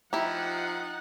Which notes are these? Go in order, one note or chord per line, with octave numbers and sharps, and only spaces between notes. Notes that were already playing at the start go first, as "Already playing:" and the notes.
F3 D#4 E4 G4 F#5 A#5